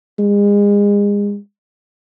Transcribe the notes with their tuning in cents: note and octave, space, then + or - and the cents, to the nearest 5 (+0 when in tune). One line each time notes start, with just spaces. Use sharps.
G#3 -35